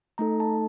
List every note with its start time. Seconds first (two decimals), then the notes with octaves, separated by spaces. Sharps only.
0.18 A3 D#4 A4 A#5
0.40 A5